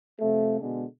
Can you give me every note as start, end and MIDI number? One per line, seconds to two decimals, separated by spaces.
0.20 0.60 48
0.20 0.60 53
0.20 0.60 57
0.61 0.84 47
0.61 0.84 50
0.61 0.84 56